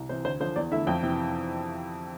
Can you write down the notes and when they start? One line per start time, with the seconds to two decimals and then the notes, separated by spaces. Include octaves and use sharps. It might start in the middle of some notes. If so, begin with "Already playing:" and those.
Already playing: C2
0.09 C3 E3 C5
0.25 D2 C5
0.40 D3 F3 C5
0.56 E2 D5
0.71 D3 A3 E4 E5
0.87 F2 G5
1.03 C3 E3